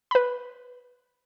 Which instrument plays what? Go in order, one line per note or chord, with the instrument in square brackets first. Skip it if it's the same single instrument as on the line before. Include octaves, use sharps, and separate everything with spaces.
[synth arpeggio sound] B4 B5